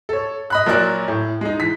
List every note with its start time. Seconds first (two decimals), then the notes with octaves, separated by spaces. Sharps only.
0.09 A4 C#5
0.50 D#5 B5 F#6
0.66 A#2 F#3 F#4 A#4 D5 F#6
1.08 A2
1.41 G#3 D#4
1.60 E3 B6